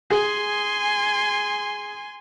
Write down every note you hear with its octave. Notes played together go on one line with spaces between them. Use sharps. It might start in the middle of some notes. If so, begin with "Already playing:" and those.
G#4 G#5 C6